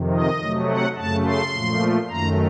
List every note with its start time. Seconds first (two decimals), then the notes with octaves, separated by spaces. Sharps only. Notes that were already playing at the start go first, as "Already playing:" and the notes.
Already playing: F2 C3 D#3
0.12 D#5
0.41 C3 F#3 A3
0.69 F#5
0.97 F#2 C#3 A3 A5
1.25 C6
1.53 A#2 F3 A3
2.09 F#2 D#3 A3 A#5